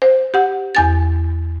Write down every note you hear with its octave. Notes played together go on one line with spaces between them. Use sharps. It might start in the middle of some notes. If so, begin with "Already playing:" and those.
C5
G4 F#5
E2 G#5 A6